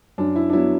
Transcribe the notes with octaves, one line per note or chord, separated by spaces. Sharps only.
F#2 D4
E4
D4
F#3 B3 E4